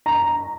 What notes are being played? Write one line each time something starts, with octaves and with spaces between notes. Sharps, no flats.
A#5